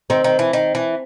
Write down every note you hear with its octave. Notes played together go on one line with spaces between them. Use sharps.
D#3 C4
D#3
E3
D#3
E3